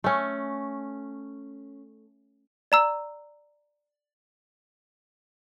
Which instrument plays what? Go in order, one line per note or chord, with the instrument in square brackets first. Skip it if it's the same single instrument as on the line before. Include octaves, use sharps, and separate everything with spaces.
[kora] A3 C#4
[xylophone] D5 A#5 E6